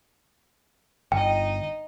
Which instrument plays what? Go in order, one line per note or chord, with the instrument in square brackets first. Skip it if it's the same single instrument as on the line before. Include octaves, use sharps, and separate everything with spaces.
[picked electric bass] G1 [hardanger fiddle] D#4 D#5 [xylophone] G5